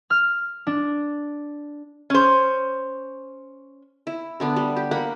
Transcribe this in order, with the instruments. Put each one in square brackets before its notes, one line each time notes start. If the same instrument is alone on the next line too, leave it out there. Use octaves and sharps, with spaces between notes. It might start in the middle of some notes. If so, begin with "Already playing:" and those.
[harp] F6
D4
[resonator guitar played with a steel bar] C#4 C5
[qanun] E4
D3 B3 D4
G3
G4
A#3 F#5 B5